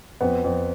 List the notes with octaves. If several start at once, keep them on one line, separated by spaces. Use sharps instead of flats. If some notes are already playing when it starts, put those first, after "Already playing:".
F2 B3
F2